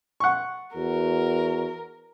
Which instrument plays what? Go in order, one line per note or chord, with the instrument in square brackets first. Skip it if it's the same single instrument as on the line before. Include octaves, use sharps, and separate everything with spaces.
[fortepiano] F#5 C#6
[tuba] E2 [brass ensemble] F#4 [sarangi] A#4